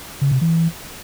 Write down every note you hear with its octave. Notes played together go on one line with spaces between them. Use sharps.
C#3
C3
E3